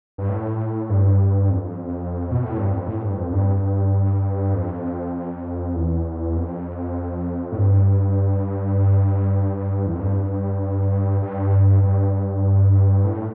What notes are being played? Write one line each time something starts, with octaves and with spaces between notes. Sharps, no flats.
G2
A2
G2
F2
B2
A2
G2
F2
A2
G2
F2
G2
F2
E2
F2
A2
G2
E2
F2
G2
G2
G2
A2